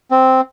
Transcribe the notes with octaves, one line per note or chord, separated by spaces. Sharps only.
C4